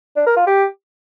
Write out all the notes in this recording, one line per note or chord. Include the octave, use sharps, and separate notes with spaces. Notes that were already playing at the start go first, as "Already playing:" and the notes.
D4
A#4
F4
G4